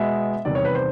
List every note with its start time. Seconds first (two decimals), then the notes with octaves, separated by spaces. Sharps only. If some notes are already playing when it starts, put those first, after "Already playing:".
Already playing: B2 G#3 B3 E5
0.45 E2 C3 D#3 G3 D5
0.55 C#5
0.65 B4
0.75 C5